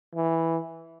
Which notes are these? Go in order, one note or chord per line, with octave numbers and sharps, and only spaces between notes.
E3